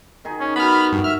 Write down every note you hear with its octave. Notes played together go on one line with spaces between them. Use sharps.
D#3 D#4 G#4
C#4
B3 F#4 B5 F6
G2
E5 F6